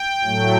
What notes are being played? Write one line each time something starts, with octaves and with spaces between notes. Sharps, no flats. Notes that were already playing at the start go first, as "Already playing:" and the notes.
Already playing: G5
A2 F#3 A3